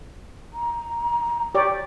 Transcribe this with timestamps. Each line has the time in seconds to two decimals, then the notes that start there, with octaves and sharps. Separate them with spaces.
0.53 A#5
1.55 G4 C#5 D5